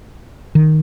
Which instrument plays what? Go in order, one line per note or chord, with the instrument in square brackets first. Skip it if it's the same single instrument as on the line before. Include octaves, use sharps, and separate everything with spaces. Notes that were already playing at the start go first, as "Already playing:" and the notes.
[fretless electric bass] D#3